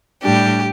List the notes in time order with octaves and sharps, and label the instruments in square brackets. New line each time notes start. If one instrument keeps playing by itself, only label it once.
[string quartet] A2 G3 D4 G4